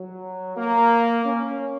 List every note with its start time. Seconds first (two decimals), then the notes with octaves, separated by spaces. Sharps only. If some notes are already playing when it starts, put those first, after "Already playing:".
Already playing: F#3
0.57 A#3
1.25 C#4